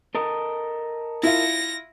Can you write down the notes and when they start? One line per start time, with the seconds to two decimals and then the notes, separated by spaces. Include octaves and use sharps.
0.15 A4 A#4 D#5
1.23 E4 F4 A#6